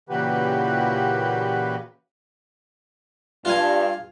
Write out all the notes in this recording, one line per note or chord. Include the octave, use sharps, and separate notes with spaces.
A#2 C#3 E3 F#4 G4 B4
G2 F4 F5 G#5